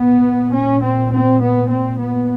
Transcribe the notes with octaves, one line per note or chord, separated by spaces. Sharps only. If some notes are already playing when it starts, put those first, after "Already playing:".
Already playing: A#2 B3
C#4
C4
C4
B3
C4
B3